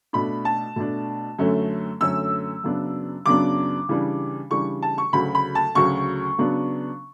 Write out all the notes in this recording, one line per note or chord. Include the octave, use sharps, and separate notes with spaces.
B2 A3 D4 B5
A5
B2 A3 D4
F#2 D3 A3 C#4
F#2 D3 A3 C#4 E6
F#2 C#3 F#3 B3 D4
F#2 C#3 F#3 B3 D4 D6
C#3 E3 G3 D4
C#3 E3 G3 D4 C#6
A5
C#6
D2 C#3 F#3 B5
B5
A5
D2 C#3 F#3 C#6
C#3 F#3 B3 D4